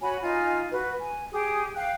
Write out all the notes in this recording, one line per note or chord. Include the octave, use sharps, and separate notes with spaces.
F#4 C#5 G#5 B5
D#4 F4 G#5
F#4 B4
G#5
G4 G#4 D#6
F5 G5 F#6